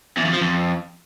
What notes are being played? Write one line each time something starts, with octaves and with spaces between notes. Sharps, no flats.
E2
F2
F3
F2